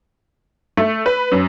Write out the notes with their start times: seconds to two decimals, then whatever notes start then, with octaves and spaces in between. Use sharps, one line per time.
0.77 A3
1.06 B4
1.32 F#2